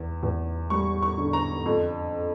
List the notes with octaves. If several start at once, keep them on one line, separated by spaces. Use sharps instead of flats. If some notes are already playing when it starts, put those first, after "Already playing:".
Already playing: E2
E2
G3 C#6
C#6
D3
A#5
F2